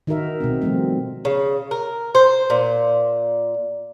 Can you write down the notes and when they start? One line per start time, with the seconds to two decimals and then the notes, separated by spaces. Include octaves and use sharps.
0.07 D#3 D#4 F#4 A#4 E5
0.40 B2 G#3 C4
0.61 D#3 F3 G3 A3 C4
1.25 C#3
1.71 A#4
2.15 C5
2.50 A#2